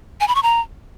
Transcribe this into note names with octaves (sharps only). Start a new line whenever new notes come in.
G#5
B5
C#6
A#5